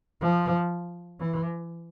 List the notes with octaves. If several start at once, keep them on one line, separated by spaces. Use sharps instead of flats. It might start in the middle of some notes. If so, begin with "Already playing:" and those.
F3
E3